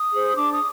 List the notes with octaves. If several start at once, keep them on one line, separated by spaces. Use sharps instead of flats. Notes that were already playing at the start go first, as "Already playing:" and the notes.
Already playing: D#6
G#4 C5
D4 D6
D#6